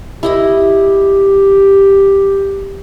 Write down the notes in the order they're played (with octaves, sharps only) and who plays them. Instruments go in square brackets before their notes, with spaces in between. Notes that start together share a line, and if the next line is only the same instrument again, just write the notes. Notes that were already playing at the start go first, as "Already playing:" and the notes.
[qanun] E4 D#5 B5 [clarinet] G4